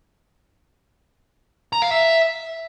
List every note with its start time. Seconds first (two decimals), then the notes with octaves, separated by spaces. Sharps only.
1.73 A#5
1.82 F5
1.91 E5